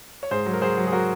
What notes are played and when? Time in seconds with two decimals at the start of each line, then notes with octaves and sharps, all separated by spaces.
0.23 C#5
0.31 G#2 G#4 C5
0.46 F#3
0.53 A#4
0.62 F#3 G#4 C5
0.78 F#3
0.87 G#4
0.92 F#3 F#4 A#4